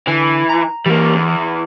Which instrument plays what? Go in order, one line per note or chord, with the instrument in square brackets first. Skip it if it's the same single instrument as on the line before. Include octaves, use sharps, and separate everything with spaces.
[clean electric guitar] D3 G#5 [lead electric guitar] E3
[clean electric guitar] A#5
[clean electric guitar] E3 [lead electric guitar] G3 A#3
[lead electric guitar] E2